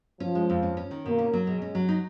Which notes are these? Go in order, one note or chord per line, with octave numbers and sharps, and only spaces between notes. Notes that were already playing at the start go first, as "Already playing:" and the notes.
F3 C#4
G#3
F2
C#4
C#4
D#3
B2 A#3
C#4
F#3
B2 G#3
C#4
F#3
D#4